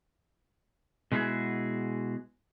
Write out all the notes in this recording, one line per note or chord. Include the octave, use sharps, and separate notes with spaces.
B2 G#3 E4 F#4 G#4